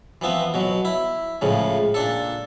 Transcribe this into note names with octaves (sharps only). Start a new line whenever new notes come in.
E3 F3 B3 C4
B2 F#3
E4
C#2 A2 C#3 F3
A#2 D4 A4